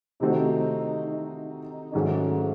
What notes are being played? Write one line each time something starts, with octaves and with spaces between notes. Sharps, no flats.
C3 D#3 A3 C4 D#4 F#4
D#4
G#2 D#3 F#3 A3 C#4